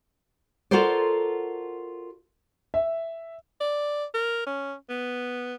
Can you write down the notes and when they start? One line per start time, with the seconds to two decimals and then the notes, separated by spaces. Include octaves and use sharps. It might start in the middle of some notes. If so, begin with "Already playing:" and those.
0.71 F4 F#4 A4 A#4 C5 D5
2.74 E5
3.61 D5
4.14 A#4
4.46 C#4
4.90 B3